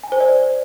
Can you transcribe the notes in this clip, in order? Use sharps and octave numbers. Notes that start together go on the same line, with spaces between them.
G#5
C5
D5